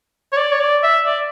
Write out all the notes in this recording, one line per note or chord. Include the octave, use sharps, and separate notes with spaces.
C#5
D5
C#5
D5
E5
D5